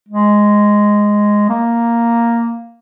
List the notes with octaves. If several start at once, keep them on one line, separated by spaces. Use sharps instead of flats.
G#3
A#3